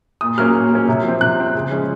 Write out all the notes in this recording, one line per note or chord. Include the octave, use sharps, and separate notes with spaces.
A#2 D#6
F#3 A#3 C#4 F6
A#2
F#3 A#3 C#4
C3
F3 C4
C3 F#6
F3 C4
C#3
F3 G#3 C#4